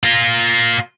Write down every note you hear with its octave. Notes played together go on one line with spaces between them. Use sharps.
A#3 F4